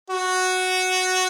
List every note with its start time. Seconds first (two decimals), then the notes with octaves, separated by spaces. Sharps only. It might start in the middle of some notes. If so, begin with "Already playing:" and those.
0.10 F#4